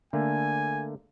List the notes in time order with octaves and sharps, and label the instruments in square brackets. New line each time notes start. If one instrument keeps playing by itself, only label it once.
[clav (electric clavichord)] D3 A3 A#3 [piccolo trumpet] G#5